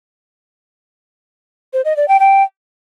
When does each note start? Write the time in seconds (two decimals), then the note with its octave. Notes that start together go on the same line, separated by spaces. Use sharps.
1.73 C5
1.85 D#5
1.97 D5
2.08 G5
2.20 G5